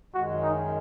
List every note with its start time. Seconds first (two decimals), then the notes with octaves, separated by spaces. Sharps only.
0.14 F#2 D#3 G#3 F#4
0.43 D#4